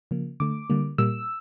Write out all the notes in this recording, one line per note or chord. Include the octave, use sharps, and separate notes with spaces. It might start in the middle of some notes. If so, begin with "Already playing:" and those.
C#3 F3 A#3
D3 A3 D6
D3 G3 A#3
A#2 G3 A#3 E6